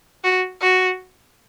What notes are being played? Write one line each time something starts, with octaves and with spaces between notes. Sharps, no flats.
F#4
F#4